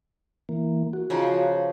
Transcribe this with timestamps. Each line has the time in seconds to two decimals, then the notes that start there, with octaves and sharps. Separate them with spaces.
0.49 E3 A#3
0.93 F#4
1.10 C#3 F3 D#4